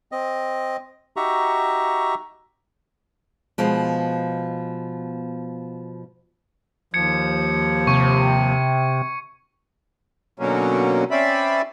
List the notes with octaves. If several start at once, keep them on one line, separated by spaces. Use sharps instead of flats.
C4 D#5
D#4 F#4 G4 E5 A#5 C#6
B2 F3 G#3 B3
D#2 F3 G#6 C#7
C3 C#6
B2 D3 F#3 A#3 C#4
C4 C#4 D5 E5 B5